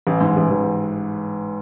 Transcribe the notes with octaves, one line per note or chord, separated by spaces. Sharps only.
A1
G#2
A1
A1